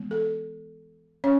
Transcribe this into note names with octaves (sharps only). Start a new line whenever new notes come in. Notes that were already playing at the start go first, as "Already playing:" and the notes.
Already playing: E3 G#3 B3
A4
C#4 C#5